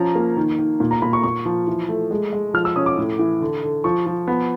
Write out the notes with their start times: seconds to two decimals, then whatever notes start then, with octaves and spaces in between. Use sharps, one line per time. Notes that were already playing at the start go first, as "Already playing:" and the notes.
Already playing: F3 C#4 A#5
0.15 A#3
0.37 D#3
0.59 D#3
0.80 A#2
0.91 A#5
1.02 A#2 B5
1.13 C#6
1.23 A#2 C#6
1.45 F3
1.67 E3
1.89 A3
2.11 G#3
2.33 G#3
2.54 F3 F6
2.65 E6
2.76 C#4 D#6
2.86 D6
2.98 A2
3.19 E3
3.41 D3
3.63 D3
3.84 F3 C#6
4.06 F3
4.27 B3